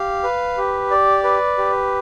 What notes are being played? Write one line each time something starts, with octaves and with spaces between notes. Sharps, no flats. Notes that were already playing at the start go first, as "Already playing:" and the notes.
Already playing: G4 F5
B4
G4
D5
B4
G4